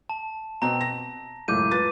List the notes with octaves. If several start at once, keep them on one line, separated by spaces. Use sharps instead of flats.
A5
B2 C4 A#5
A#6
C#2 F#2 A2 D6 G6 D#7
F4 B4 A6